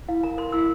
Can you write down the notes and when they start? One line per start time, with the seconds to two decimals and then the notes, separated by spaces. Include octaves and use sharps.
0.08 E4 F5
0.23 A#4 A#5
0.38 A#4 C6
0.52 E4 E6